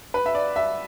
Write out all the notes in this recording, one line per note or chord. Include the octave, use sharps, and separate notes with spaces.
B4
E5
D5
E5